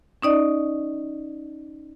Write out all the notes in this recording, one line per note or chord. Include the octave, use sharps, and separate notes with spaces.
C#4 D#4 D5 D#5